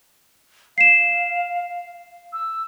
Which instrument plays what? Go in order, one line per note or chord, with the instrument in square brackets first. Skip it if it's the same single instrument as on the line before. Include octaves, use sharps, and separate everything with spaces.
[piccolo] F5 [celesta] C7 E7
[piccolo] E6